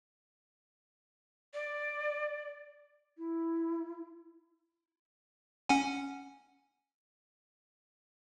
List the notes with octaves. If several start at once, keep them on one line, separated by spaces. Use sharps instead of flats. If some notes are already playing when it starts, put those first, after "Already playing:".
D5
E4
C#4 F#5 G#5